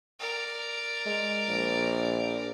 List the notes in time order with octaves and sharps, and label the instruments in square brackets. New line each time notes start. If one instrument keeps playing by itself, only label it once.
[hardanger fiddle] A#4 D5
[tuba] G#3
A#1